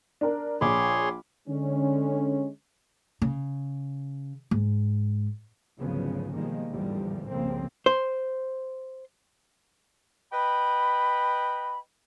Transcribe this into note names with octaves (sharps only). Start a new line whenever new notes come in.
D4 A#4
A#1 G#4 C#5 B5 C6 D6
D3 G#3 C#4
C#3
G#2
G#1 D2 C#3 F3 F#3 B3
B2 D#3 F3 G3 G#3 A#3
A1 E2 G#2 D3 F3 G3
C2 F2 C#3 A#3 C4
C5
B4 D#5 G5 B5